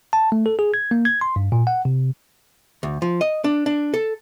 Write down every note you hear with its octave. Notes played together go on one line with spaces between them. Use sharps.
A5
A3
A4
G#4
G#6
A#3
G#6
C6
G2
A#2
F#5
C3
D2
F3
D#5
D4
D4
A4